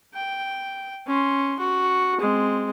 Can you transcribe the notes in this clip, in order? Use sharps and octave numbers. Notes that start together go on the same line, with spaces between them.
G5
C#4 C6
F#4
G#3 C4